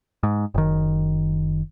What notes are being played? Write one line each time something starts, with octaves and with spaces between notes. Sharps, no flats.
G#2
F#1 D#3